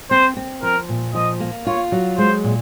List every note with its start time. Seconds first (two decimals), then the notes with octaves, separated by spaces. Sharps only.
0.11 C4 C5
0.37 C4
0.63 F3 A#4
0.89 A#2
1.15 F3 D#5
1.40 A#3
1.67 F4 C#5
1.92 F#3
2.18 G#3 C5
2.44 A#2